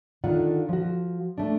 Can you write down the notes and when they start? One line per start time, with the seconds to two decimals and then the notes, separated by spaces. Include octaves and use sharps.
0.24 D3 D#3 F4 F#5
0.69 F3 F#4
1.38 A3 D4